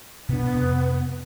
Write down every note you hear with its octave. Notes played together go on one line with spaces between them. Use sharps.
B2 B3 D4
F2 C3